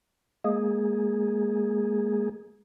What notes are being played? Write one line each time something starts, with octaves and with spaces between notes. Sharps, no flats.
G#3 A#3 G#4